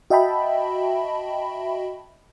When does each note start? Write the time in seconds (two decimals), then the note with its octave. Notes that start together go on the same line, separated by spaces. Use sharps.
0.10 F#4 D#5 E5 G5 A5 B5